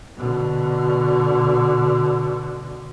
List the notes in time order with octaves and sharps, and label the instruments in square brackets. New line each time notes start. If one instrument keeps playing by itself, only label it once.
[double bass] B2 D3